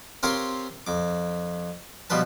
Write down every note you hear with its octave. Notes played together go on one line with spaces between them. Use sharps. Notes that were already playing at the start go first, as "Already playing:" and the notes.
C4 F4 G4 A#4 C5 C#5
F2 D6
B2 F3 G3 B4 A5